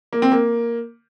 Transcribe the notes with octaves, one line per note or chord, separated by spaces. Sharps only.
A#3
C4
A#3